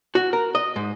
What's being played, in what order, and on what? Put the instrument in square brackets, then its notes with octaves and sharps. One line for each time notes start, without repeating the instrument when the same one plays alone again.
[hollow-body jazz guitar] F#4
A#4
D#5
G#2